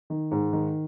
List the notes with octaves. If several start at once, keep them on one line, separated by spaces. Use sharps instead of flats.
D#3
G#2
D#3